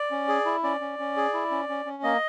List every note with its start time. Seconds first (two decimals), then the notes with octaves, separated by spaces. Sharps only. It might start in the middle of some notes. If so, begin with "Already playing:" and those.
Already playing: D5
0.11 C#4
0.28 G#4
0.45 E4
0.63 C#4 D5
0.81 C#4
0.99 C#4
1.17 G#4
1.33 E4
1.51 C#4
1.69 C#4
1.86 C#4
2.03 A#3 D#5